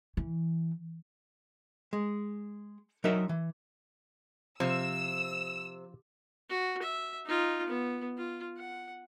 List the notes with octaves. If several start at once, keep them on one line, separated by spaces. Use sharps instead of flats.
E3
G#3
F#3 D#4 A#4 D#5 E5
E3
C3 F3 E6
F#4
E5
D#4 F4
B3
F4
F#5